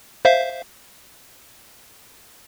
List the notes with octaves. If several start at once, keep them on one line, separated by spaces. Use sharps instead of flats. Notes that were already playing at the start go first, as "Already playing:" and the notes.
C5 E5 F5